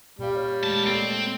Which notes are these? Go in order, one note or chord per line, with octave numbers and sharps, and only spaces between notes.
A#2 G3 F5
C#5
D#3 G#3 A3 A5
A#3 C4 A4 C#5